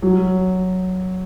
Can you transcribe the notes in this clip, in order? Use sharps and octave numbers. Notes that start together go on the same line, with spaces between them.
F#3